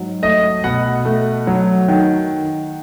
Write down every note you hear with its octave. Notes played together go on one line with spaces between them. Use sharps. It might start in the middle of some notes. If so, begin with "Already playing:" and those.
Already playing: G#2 F#3
A3 D#5
B2 F#5
A3
F#3
D#3